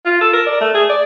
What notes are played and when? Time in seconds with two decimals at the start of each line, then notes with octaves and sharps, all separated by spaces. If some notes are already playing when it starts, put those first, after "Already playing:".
0.05 F4
0.21 A4
0.33 A#4
0.46 D5
0.60 A3
0.74 G#4
0.89 D5